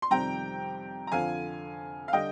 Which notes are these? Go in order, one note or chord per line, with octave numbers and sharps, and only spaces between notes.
C6
F2 C3 D#3 G3 G5 A#5
A#5
F2 D3 F3 F5 G#5
F5
D3 G3 D#5 G5